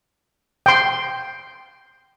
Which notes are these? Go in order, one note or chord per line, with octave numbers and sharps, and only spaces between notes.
G5 C6